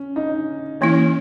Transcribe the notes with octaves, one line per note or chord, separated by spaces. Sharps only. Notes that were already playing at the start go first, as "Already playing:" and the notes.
Already playing: C#4
D#4
E3 A#3 C#4 E4